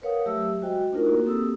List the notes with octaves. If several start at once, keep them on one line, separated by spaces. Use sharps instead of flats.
A#4 B4 C#5 F5 F#5 D#6
F#3 A3 G4 E5 E6
G#3 F#4 C5 D#5 G5
A3 D4 D#4 F4 A#4
A#3 E4 F#4
A#3 C4 G4 A4 D#6 E6